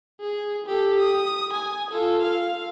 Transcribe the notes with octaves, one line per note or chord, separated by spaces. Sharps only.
G#4
G4 A4
D#6
G#5
F4 A4
F5